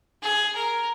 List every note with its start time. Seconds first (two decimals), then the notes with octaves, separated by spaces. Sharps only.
0.23 G#4
0.55 A#4